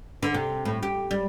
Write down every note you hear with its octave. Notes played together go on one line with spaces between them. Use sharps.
D3
C3
A2
G4
G3